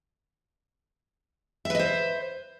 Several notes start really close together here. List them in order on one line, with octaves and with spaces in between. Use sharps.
E5 B4 D#5 C5